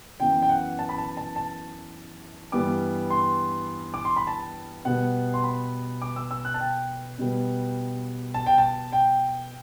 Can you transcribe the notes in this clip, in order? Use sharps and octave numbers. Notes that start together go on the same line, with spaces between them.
F#2 E3 B3 G5
G5
F#5
A5
B5
A5
A5
A5
G2 E3 G3 B3 D6
C6
D6
C6
B5
A5
B2 G3 B3 F#5
C6
B5
D6
E6
E6
F#6
A5
G5
B2 G3 B3
A5
G5
A5
G5